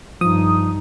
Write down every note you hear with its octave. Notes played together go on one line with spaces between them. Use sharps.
G2 F3 D#4 D#6